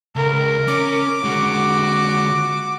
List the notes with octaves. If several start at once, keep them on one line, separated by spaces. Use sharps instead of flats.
C#2 A#4
C#4 D6
D3 G#3 F#4